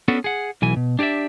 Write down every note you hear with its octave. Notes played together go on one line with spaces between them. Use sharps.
B3 C#4 D4 F#4 A4 B4
G#4 F#5
B1 E3 G#5
B2
D4 G4 C#5 D5 E5